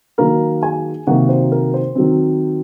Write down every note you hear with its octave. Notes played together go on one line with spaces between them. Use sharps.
D#3 F#3 A#3 A#4 A#5
G#4 G#5
C3 D#3 F#3 A#3 F#4 F#5
C5
A#4
C5
D#3 F#3 C4